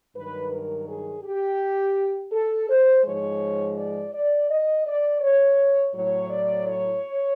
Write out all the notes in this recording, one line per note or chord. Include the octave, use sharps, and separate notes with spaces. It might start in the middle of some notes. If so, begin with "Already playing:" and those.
G2 D#3 F#3 B4
A#4
G#4
G4
A4
C5
G#2 F3 G#3 C#5
D5
D5
D#5
D5
C#5
A2 F#3 C#5
D5
C#5